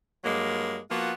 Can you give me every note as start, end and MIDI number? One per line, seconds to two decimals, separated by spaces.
0.24 0.79 43
0.24 0.79 54
0.24 0.79 56
0.24 0.79 58
0.90 1.12 53
0.90 1.12 58
0.90 1.12 59
0.90 1.12 65
0.90 1.12 66